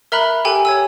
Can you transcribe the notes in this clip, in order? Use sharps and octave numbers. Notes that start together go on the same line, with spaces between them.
A#4 E5 A#5 B5 F#6
G4 A4 G5 G#5
C#5 G#5 E6